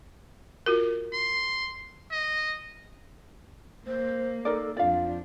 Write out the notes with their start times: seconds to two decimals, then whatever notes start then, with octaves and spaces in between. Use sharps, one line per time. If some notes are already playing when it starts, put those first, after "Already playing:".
0.66 F4 F#4 A#4
1.13 C6
2.11 D#5
3.87 A#3 C5
4.45 D#4 A4 A#4 D5
4.77 F2 D4 F4 D5 F5